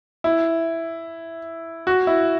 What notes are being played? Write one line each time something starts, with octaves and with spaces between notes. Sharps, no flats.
E4
F#4
E4